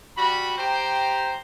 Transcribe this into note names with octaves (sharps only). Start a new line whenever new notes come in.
G3 F#4 B5
G4 C5 G5 A#5